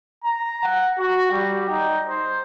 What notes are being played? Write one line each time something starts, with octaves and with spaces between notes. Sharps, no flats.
A#5
F#5
F#4
G3
D#4
C5